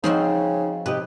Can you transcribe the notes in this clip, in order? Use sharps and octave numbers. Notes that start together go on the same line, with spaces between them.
C#3 F3 C4 D#4 F#4 D#5
C3 G4 B4 D#5